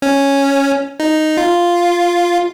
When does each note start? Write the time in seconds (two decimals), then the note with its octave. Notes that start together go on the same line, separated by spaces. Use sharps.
0.02 C#4
1.00 D#4
1.37 F4